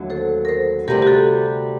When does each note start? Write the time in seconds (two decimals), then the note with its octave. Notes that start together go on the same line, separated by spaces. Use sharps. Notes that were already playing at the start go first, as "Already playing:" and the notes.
Already playing: D#2 D3 F#3 A3
0.10 A4 C5
0.45 A#4
0.49 A4 C5
0.87 D2 C3 G3 C4 G4 A#4
1.02 G4
1.07 F#4 A4